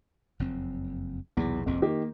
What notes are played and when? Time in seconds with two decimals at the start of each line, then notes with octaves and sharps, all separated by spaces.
0.40 F#1 F2 C4
1.37 B1 E2 C3
1.66 F1 A#1 F2 A#2
1.82 D#3 A#3 G4